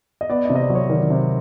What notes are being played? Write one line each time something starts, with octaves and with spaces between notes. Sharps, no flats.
D#5
B3 D5
D#5
C3
D#5
D5
F#3
C#5
D#3 D5
C3